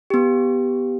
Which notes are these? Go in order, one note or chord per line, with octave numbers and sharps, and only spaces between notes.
B3 G4